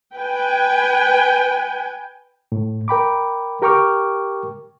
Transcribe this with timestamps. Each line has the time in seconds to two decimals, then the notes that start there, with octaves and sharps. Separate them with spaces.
0.15 B4 G5 G#5
2.52 A2
2.88 A#4 G5 B5 D6
3.62 G4 A#4 G5 C#6 D6 F6